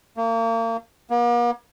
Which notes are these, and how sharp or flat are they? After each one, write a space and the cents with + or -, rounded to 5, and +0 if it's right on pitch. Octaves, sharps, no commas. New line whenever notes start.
A#3 -35
A#3 +45